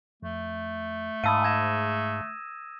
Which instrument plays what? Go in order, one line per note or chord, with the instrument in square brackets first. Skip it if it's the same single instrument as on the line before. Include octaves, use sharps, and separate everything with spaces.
[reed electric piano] F2 [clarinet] A3
[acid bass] G#2 [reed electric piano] F5 A5 B5 [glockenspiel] D#6 E6 D#7
[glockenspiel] G#6 A#6 E7